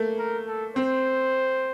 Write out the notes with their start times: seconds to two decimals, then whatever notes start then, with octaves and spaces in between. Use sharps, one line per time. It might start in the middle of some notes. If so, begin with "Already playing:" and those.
Already playing: A3 A#3
0.18 A#4
0.47 A4
0.76 C4 C5